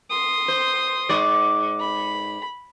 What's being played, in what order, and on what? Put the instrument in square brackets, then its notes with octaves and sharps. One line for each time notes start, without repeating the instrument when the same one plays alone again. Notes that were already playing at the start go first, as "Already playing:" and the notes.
[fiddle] C6 D#6
[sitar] C5
G#2 D5
[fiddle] B5